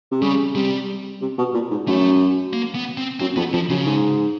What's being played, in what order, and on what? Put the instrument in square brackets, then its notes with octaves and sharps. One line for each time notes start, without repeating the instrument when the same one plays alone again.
[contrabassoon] C3
[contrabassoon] C#3 [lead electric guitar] G3
[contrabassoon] C3 [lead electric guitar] G3
[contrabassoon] C3
B2
A#2
G#2
[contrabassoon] F#2 [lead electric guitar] A3
[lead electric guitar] A#3
B3
C4
[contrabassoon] F#2 [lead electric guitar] C4
[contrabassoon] F2 [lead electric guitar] B3
[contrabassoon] F2 [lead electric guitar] F3
[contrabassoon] F#2 [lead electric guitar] C#3
[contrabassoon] G#2